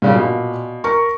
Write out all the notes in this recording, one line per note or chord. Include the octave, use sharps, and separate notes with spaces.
G2 A#2 C#3 G3
B2
A#4 C#6